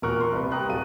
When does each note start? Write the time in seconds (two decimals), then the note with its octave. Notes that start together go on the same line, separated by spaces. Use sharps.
0.02 E1 A#2 A#4 C#6 F#6
0.20 C6 C#6
0.33 C2 B4
0.52 G4 G5 A#5 C#6 D#6 F#6
0.69 D1 A4 F5 D#7